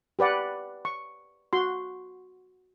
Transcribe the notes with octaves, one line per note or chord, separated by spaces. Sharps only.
G4 B4 D5 F#5
C#6
F#4 C6